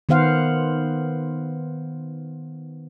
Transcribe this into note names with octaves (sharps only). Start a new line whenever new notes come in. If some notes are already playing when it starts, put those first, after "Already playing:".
D#3 B3 C5 F5 F#5